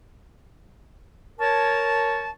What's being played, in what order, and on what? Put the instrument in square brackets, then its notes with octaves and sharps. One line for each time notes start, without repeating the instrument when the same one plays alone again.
[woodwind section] A#4 C#5 A5